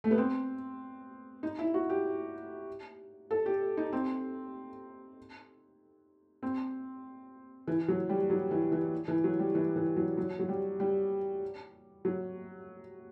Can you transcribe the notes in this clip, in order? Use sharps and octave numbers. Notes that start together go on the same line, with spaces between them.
A3
B3
C4
D#4
E4
F#4
G4
A4
G4
D#4
C4
C4
E3
F#3
G3
F#3
E3
E3
E3
F#3
G3
E3
E3
F#3
F#3
F#3
G3
G3
F#3